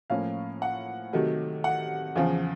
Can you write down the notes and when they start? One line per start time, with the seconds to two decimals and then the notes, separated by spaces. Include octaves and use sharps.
0.10 A2 F3 A#3 C#4 F5
0.62 F#5
1.13 C3 D#3 F#3 A3
1.64 F#5
2.16 E2 C#3 F3